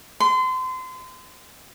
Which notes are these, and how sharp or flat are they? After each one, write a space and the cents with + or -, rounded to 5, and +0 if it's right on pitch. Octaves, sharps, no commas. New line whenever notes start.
C6 -30